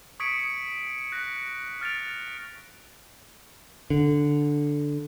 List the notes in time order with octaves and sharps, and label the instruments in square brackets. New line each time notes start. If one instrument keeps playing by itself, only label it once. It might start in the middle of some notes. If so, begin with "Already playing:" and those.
[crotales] C#6 D#6 G#6 B6 C#7 D7
F#6 A#6 C#7
F6 A6 D7 F7
[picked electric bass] D3